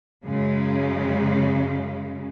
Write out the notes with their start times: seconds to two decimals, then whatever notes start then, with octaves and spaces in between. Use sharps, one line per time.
0.24 F#2 C#3 G#3